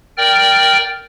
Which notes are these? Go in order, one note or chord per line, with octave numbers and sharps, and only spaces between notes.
A#4 D5 G5 F6